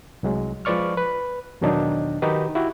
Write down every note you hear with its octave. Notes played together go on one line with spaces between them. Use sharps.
C2 F#3 G#3
F3 G#3 B4 D5 C#6 F6
B4
E2 B2 D#3 F#3 D4 D#4
D#3 D#4 F#4 G4 B4
E4 F#4 G4